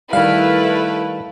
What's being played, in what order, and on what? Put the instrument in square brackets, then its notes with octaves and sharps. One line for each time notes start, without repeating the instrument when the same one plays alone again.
[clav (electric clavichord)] D#3 G3 [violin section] A3 E4 B4 [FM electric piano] F5